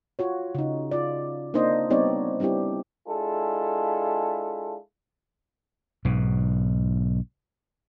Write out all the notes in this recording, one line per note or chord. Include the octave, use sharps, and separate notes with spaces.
F4 F#4 C#5
C#3 D#4
F4 D5
A#3 C4 D4 D#4 C5 D#5
G3 B3 C4 D#4 C#5 D5
G3 C4 D4 E4 G4
G#3 D4 E4 F4 G#4 A4
B1 G#2 B2